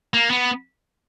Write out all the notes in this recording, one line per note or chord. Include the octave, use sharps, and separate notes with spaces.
A#3
B3